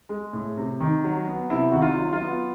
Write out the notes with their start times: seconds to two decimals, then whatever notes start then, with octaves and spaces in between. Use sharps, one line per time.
0.09 G#3
0.33 A2
0.57 C3
0.80 D#3
1.04 F#3
1.27 B3
1.50 C3 E4
1.72 D#3 F#4
1.82 F4
1.97 F#3
2.13 F4
2.21 B3